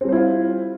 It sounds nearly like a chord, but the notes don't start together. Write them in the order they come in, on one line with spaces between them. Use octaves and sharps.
C4 G3 C5 E4 F4